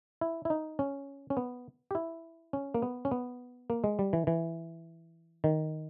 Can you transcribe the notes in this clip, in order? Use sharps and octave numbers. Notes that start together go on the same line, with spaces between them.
E4
E4
D#4
C#4
C#4
B3
G4
E4
C#4
A#3
B3
C#4
B3
A#3
G#3
G3
E3
E3
D#3